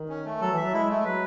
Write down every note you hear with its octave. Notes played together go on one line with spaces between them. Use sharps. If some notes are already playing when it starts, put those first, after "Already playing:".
Already playing: D#3
C#4
A3
F#3 A4
E3
F#3 E5
G#3 E4
A3
F#3 B4